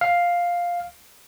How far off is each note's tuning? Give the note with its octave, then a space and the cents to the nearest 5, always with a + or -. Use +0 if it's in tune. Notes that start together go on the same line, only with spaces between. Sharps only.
F5 +5